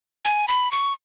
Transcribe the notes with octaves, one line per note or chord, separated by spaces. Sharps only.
G#5
B5
C#6